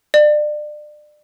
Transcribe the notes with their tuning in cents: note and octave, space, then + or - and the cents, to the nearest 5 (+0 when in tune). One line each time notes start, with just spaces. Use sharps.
D5 +30